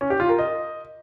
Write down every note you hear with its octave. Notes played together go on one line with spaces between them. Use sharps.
C#4
G4
F4
A#4
D#5